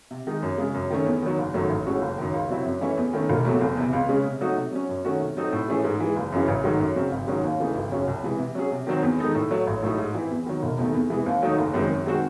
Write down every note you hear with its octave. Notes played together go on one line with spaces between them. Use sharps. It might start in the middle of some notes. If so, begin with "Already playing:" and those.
C3
D#3 G#3 D#4
F#2
C#3 G#3
F#2
D#3 A3 C#4
E2
D#3 F#3
F#1
F#2 D#3 F#3 A3
A1
A2 G#3 C#4 F#4
F#1
F#2 D#3
C#2
C3 F#3 C4 E4
F#2
E3 A3 C#4 E4
E2
D#3 A3 C#4
E1
E2 C3 F#3 A3
F#1
E2 C3
C#2
C#3 G#3 C#4
C3
F#3 A3 D#4 F#4
C3
F#3 C#4
F#2
D#3 A3 C#4 F#4
C3
F#3 C4 D#4 A4
A2
E3 A3 C#4 G#4
G#2
E3 G#3
F#1
F#2 C#3 E3
A1
G#2 D#3 F#3 A3
F#2
C#3 F#3 C4
G#1
G#2 D#3 F#3 C#4
D#2
C#3 E3 A3 D#4
G#1
F#2 C#3 F#3 C#4
C2
C3 E3 G#3
C3
F#3 C#4 G#4
C3
D#3 F#3 C4
E2
D#3 G#3 D#4 A4
A2
F#3 A3
A1
A2 F#3 A3 D#4
G#2
E3 C4 E4
E2
D#3 F#3
E1
E2 C3 D#3 A3
E2
C3 E3 G#3
D#2
D#3 F#3 A3 D#4
F#1
F#2 D#3 G#3 C4
F#2
D#3 G#3 C4 F#4